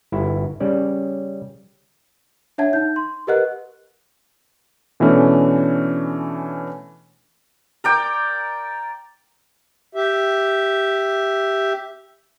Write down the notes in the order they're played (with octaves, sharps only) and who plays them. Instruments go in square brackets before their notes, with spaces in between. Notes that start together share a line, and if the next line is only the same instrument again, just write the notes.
[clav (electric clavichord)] G1 E4 F#4
C#3 G3 C#4 D5
[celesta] D4 C#5 E5 F#5 A5 G#6
D#4 G6
C6
G4 A#4 B4 D#5 F#5 F#6
[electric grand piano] B2 E3 A3 C#4 D4 A4
[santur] A#4 D5 G5
[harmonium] G4 E5